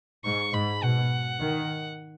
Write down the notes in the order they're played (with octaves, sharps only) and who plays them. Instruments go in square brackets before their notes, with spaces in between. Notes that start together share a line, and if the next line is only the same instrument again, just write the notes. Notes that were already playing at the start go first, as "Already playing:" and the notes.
[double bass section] G#2 [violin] C#6
[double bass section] G#2 [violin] B5
[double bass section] B2 [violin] F#5
[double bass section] D#3